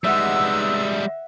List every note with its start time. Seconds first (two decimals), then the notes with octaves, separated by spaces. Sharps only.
0.04 G3 G#3 D#4 B4 E5 F#5 E6